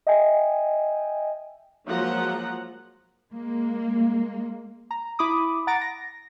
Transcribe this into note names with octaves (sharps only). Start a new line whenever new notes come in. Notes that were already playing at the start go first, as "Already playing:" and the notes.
D#5 E5 G5 G#5
F3 F#3 G#3 A#3 F#5 A#5
G#3 A#3
A#5
E4 B5 D6 D#6
F#5 A#5 A6 A#6 D7
A#6